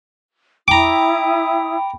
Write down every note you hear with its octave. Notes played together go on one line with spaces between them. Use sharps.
E4 G5 A#5 B5 D6 D#6